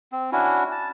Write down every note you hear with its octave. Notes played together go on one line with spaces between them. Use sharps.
C4
C#4 D4 E4 F#4
A5